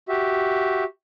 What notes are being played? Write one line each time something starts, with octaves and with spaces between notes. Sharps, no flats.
F#4 G4 E5